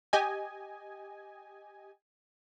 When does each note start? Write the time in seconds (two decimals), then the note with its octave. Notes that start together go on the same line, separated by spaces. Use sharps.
0.13 G4 D#5 G#5